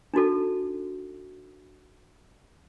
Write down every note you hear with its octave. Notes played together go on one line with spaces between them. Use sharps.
D4 D#4 F#4 A4